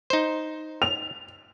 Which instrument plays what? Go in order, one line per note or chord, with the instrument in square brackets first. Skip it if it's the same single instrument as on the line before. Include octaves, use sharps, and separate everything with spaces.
[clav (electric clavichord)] D#4 C5
[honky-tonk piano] F7